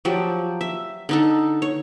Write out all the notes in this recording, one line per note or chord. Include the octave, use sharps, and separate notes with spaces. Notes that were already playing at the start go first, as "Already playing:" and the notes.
F3 F#3 G4 D5
E5
D3 D#4 A4
C#5